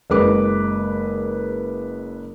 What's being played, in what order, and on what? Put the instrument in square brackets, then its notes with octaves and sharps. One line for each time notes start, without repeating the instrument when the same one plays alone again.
[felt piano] F#1 G#3 B4 D6